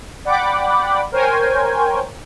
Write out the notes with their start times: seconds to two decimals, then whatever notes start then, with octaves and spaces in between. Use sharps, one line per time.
0.25 D5 F#5 G5 B5 D6
1.12 A#4 C5 C#5 G5 G#5